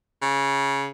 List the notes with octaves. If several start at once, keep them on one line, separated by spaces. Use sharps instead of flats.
C#3